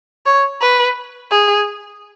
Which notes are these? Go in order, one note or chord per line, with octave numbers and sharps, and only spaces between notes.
C#5
B4
G#4